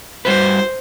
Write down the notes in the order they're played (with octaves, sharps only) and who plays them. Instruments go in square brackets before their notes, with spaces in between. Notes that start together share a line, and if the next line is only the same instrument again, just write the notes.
[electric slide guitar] G3 F#4 B4 [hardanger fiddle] C5